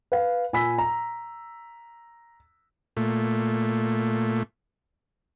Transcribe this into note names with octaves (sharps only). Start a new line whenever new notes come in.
B4 F5
A#2 G#5 B5 E6 B6
A#5
A#2 A3